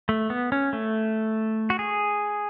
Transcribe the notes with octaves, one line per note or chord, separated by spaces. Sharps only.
A3
B3
C#4
A3
F#4
G#4